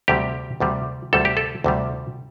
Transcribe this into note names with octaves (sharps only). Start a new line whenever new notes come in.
D2 C3 G3 G4
D2 C3 G3
D2 C3 G3 A4
G4
A4
D2 C3 G3